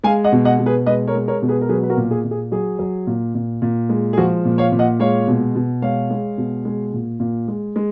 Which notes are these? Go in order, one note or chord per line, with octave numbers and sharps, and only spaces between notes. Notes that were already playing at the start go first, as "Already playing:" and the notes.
G#3 F5 G#5
D#5 F#5
B2
D#5 F#5
B2
G#4 B4
G#3 B4 D#5
A#4 C#5
G#3
A#4 C#5
B2
G#4 B4
A#4
F#3 G#4 B4
B4
F#4 A#4
A#2
G#4
A#2
G#4
F#3 G#4
F#3
A#2
A#2
A#2
G#3
G#4
F3 F#4
A#2
C#5 F5
A#2
D#5 F#5
G#3 C#5 F5
B2
B2
G#3 C#5 F5
G#3
B2
G#3
A#2
A#2
G#3
G#3